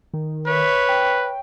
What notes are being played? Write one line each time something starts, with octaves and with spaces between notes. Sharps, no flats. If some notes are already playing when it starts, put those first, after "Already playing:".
D#3
B4 C#5 E5
G5